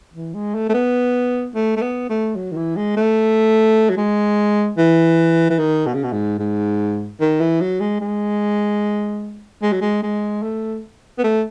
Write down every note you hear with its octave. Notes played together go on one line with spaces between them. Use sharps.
E3
G#3
A3
A3
B3
A3
A3
B3
A3
F#3
D#3
E3
G#3
A3
F#3
G#3
E3
E3
D#3
B2
C#3
B2
G#2
G#2
D#3
E3
F#3
G#3
G#3
G#3
F#3
G#3
G#3
A3
B3
A3